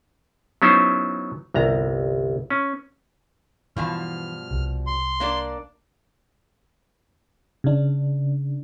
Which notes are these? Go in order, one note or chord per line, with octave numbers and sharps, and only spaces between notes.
F#3 B3 C#4 D#4 E4 C5
G1 C2 A#5
C#4
G2 B2 E3 F3 F6
C2
C6
A#3 D4 D5
C#3 D4